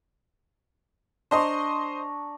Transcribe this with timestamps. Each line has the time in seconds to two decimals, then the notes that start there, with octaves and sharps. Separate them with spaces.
1.31 D4 C5 D#5 A#5 C6 C#6